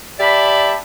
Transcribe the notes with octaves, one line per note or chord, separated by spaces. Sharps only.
G4 D5 E5 A5 B5